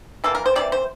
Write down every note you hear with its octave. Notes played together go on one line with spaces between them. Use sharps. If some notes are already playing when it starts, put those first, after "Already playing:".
E3 G3 A#3 A4
A#4
C5
C3 E3 A#3 D5
C5